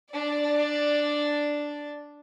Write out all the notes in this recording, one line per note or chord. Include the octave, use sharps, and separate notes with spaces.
D4 D5